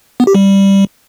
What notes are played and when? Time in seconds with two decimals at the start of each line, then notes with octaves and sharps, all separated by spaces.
0.20 B3
0.27 G4
0.35 G3